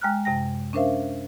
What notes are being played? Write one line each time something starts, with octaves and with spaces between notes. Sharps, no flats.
G#3 G5 A#5 F6 F#6
F#2 C3 G5 A#6
C#4 D4 A#4 C5 E5 F5